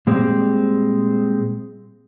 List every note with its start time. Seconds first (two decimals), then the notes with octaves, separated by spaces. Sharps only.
0.07 A#2 G3 G#3 C4